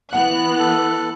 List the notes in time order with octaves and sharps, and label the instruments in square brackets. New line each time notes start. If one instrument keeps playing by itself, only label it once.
[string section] E3 B3 F#6 [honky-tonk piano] F#5
[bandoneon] A4